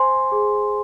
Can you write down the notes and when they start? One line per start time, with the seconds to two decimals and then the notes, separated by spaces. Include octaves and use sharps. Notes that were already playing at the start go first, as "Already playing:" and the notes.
Already playing: C5 G#5 C6
0.32 G#4